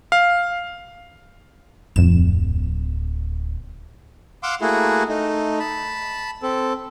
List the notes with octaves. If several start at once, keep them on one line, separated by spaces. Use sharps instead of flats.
F5
D1 F2 E7
F5 F#5 C6 D6 E6
A3 A#3 E4 F#4 G#4
A3 D#4
A5 B5
C4 A4